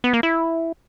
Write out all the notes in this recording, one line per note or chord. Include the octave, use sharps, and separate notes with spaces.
B3
A#3
E4